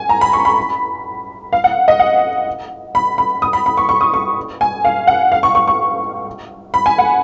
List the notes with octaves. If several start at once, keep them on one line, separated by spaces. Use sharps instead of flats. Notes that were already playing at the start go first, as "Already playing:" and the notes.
Already playing: G#5
A#5
B5
C#6
B5
F5
F#5
D#5
F#5
B5
B5
D#6
B5
B5
C#6
C#6
D#6
C#6
G#5
F5
F#5
F5
C#6
C#6
C#6
B5
G#5
F#5